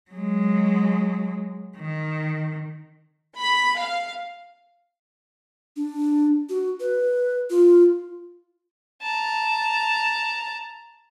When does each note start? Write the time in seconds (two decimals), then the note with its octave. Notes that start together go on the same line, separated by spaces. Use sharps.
0.11 F#3 G#3
1.77 D#3
3.37 B5
3.79 F5
5.76 D4
6.49 F#4
6.80 B4
7.50 F4
9.01 A5 A#5